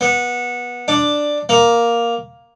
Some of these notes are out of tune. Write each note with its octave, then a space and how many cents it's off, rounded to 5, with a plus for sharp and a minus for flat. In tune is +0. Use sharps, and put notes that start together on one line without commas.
B3 -20
D4 +5
A#3 +5